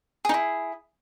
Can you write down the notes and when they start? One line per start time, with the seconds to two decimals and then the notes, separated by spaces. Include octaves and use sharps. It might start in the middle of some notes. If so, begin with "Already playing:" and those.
0.25 G#4
0.29 D#4
0.34 E4